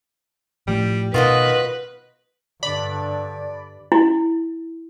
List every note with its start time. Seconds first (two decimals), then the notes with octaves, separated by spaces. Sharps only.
0.68 A2 F3 G3
1.14 B2 D#3 F4 F#4 B4 D#5
2.63 G2 D3 D5 B5
3.92 E4